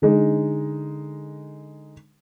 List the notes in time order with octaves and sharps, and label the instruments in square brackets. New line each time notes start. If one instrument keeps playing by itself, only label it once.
[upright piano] D3 G#3 D#4